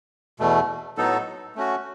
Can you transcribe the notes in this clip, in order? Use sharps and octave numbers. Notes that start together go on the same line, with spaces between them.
E2 B2 A3
A2 F#3 B3 D#4 A4
A3 C#4 F#4